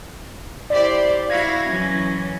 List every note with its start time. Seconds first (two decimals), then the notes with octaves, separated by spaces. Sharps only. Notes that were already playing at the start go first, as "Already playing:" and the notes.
0.70 E4 G4 C5 D5
1.30 E4 F#4 F5 G#6 A#6
1.66 E3 F#3 C#4